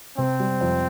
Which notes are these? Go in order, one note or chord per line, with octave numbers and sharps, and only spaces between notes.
C3 C4
G3
F2